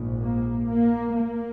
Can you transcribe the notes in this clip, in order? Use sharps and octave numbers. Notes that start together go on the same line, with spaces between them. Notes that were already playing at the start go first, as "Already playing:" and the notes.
Already playing: A#1 G#2
A#3
A#3
A#3